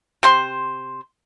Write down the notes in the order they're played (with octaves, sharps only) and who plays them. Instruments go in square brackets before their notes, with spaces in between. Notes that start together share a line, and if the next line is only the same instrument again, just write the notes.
[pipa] C3 C5 C6